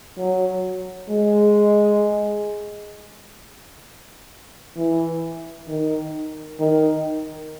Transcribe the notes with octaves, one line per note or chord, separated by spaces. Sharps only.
F#3
G#3
E3
D#3
D#3